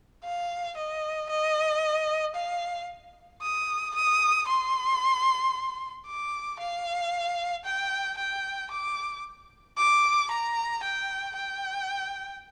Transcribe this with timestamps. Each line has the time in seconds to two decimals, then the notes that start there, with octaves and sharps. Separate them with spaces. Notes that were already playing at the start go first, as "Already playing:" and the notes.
0.24 F5
0.77 D#5
1.30 D#5
2.35 F5
3.42 D#6
3.95 D#6
4.47 C6
6.07 D6
6.60 F5
7.65 G5
8.18 G5
8.72 D6
9.78 D6
10.31 A#5
10.83 G5
11.36 G5